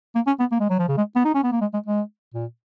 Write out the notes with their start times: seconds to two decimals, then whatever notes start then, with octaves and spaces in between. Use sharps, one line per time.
0.15 A#3
0.27 C#4
0.39 B3
0.52 A#3
0.60 G#3
0.70 F#3
0.79 F3
0.88 C#3
0.97 G#3
1.16 B3
1.25 D#4
1.35 C#4
1.44 B3
1.52 A#3
1.61 G#3
1.73 G#3
1.86 G#3
2.34 A#2